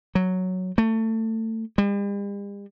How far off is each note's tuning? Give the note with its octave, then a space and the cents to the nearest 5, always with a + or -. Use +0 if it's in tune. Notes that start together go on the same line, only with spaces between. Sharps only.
F#3 +0
A3 +25
G3 +45